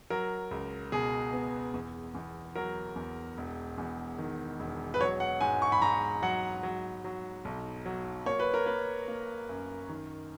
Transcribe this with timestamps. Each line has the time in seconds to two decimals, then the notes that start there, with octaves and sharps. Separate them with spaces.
0.10 F#3 A#4
0.51 C#2
0.92 B2 G#4
1.33 B3
1.74 E2
2.15 E2
2.56 F#3 A#4
2.96 E2
3.37 E1
3.78 E2
4.18 D#3
4.60 E1
4.94 B4
5.00 F#3 C#5
5.20 F#5
5.41 G#2 G#5
5.62 C#6
5.72 B5
5.82 G#2 A#5
6.22 F#3 F#5
6.63 F#3
7.04 F#3
7.45 B1
7.86 F#3
8.26 A#3 C#5
8.40 B4
8.54 A#4
8.66 A#3 B4
9.08 A#3
9.49 F#2
9.89 D#3